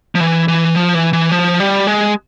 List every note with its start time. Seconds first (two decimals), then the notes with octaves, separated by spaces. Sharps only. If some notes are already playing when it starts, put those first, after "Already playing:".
0.15 F3
0.20 E3
0.48 E3
0.76 F3
0.95 E3
1.13 E3
1.32 F3
1.60 G3
1.87 G#3